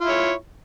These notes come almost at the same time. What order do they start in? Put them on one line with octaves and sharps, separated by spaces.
F4 E4 C#5